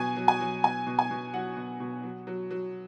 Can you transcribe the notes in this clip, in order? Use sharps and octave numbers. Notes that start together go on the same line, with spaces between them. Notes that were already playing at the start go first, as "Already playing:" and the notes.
Already playing: B2 F#3 G#5
F#3
G#5
F#3
B2 G#5
B2
G#5
B2
F#3 F#5
B2
B2
F#3
F#3
F#3